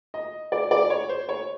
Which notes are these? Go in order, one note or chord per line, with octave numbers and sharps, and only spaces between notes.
D#5
D5
D5
C#5
C5
C#5